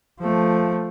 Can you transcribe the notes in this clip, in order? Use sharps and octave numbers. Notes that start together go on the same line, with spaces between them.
F3 A3